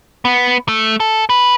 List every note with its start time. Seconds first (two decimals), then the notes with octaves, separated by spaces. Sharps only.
0.25 B3
0.68 A3
1.00 A4
1.30 B4